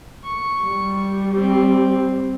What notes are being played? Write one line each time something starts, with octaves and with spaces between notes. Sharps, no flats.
C#6
G3
C4